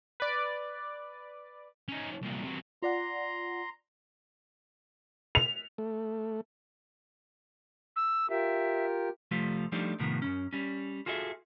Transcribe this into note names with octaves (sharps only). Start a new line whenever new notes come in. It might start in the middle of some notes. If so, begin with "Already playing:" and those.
B4 D5
C#4 D#4
C2 A#2
C3 F#3
F4 D5 F#5 A#5 C6
F7
A3
E6
F4 G4 A#4 E5
C2 F3 G3 A3 F4
F3 G3 A3 D4 D#4 G4
A2 C3 D#3 F3 B3
F#2 C3 C#4
G3 C#4
F4 F#4 G#4 A4 D#5 E5